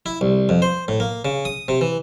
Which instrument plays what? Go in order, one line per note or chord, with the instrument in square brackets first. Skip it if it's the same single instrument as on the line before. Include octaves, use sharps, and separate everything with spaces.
[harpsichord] E4
C2
F2
C5
A2
A#3
C#3
D#6
C3
E3